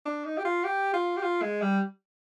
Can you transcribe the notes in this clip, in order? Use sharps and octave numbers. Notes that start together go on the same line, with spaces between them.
D4
D#4
G4
F4
G4
F4
G4
F4
G#3
G3